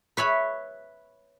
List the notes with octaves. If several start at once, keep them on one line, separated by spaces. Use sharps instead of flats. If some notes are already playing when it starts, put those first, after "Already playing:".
B4 C#5 E5 B5